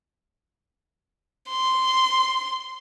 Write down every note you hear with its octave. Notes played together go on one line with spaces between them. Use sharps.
C6